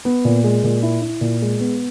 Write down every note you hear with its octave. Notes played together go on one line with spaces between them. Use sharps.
B3
A#2
G#3
A#2
E4
E4
A#2
G#3
B3